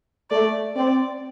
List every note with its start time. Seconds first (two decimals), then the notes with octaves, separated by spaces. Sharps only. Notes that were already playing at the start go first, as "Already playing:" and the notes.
0.31 A3 D5
0.76 C4 D5